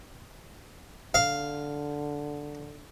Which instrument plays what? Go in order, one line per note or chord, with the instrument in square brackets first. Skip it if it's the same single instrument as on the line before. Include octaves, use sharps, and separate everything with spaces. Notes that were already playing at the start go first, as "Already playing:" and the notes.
[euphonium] D3 [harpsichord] F5